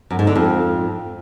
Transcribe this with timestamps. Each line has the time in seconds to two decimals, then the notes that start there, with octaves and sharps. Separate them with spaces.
0.11 F#2
0.19 G#2
0.27 D3
0.36 F2